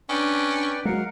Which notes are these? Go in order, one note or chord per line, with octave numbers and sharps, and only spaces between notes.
C#4 D4 B4 D5 G5
F#3 G#3 A#4 F5 F#5